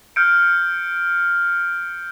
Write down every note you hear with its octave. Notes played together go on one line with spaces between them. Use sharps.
F6 G6 C#7 D7